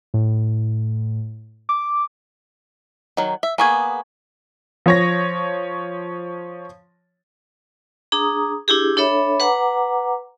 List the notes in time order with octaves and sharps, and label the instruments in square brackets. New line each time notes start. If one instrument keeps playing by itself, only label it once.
[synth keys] A2
D6
[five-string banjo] D#3 F#3
E5
[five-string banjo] A#3 B3 G#4 [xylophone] G#5 C#6 G#6
[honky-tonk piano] F3 C#5 A#6
[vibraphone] D4 G#4 A#5 D#6
D4 E4 G4 G#4
D4 A4 C#5 E5 B5
B4 F#5 A#5 D6